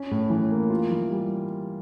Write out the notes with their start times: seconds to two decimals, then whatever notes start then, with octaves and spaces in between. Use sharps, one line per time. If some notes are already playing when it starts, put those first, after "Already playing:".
Already playing: C#4
0.11 A2
0.30 E3
0.50 A#3
0.70 F4
0.91 E3
1.10 G3